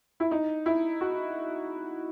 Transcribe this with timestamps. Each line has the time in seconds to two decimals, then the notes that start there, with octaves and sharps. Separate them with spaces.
0.20 E4
0.31 D#4
0.66 E4
1.01 F#4